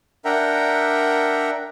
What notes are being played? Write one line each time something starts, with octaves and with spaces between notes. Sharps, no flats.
D4 A#4 E5 F#5 G5 A#5